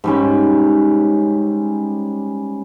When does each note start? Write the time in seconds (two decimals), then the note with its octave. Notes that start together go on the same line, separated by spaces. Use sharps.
0.04 G#2 G3 C#4